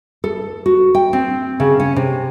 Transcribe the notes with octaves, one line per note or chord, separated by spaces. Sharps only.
A4
F#4
G5
C4
C#3
C#4
C3